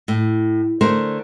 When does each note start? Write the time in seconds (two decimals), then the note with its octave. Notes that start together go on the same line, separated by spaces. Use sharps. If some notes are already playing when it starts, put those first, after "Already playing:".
0.08 A2
0.81 D3 A3 A#4 C5